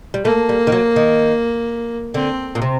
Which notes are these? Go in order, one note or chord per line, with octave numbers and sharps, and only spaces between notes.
G3
A3 A#3
G3
D#3
F#3
D#3
D3 C4
A#2
C3